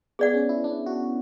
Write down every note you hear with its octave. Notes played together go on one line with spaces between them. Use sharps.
B3 G#4 D5 F#5
C#4
E4
D4
F#4